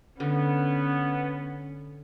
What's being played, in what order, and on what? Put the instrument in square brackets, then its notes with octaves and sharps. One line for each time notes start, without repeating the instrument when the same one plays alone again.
[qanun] D3 [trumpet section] B3 [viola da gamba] C#4